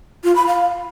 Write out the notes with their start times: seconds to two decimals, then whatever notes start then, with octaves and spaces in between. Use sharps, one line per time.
0.24 F4
0.36 B5
0.47 F5